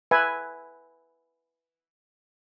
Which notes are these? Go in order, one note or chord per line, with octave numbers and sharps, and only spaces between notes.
B4 E5 G#5